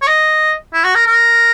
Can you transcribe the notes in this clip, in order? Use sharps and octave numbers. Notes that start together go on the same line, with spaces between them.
C#5
D#5
E4
F#4
A#4
A#4